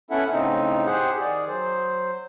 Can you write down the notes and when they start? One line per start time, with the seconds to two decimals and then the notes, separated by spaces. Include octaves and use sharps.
0.11 B3 C#4 E4 A4 E5 F#5
0.32 A2 C#3 C4 D#4
0.86 G4 G#4 C5 F#5
1.20 D#3 G#4 D5
1.48 F#3 C5